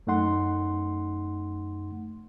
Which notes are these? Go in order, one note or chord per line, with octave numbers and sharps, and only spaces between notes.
F#2 A3 D#4 F#5 C6